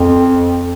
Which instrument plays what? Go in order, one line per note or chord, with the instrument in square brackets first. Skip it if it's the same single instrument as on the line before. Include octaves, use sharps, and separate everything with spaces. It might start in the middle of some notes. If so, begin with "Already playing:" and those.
Already playing: [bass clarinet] F2